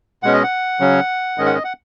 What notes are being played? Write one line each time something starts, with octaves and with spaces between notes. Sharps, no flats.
B2 G#3 C#4 F#5
D#5
F#5
C#3 F#3 C#4
G#2 D#3 G#3 C#4 D#5
F#5
D#5
F#5